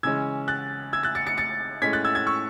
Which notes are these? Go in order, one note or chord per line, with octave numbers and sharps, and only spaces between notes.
C#3 E3 G#3 C#4 E6 G#6
F#6 A6
E6 G#6
F#6 A6
A6 C#7
A6 C#7
A6 C#7
A2 G#3 C#4 G#6 B6
F#6 A6
E6 G#6
E6 G#6
C#6 E6